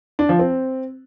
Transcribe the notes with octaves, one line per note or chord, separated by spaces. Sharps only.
D4
F3
C4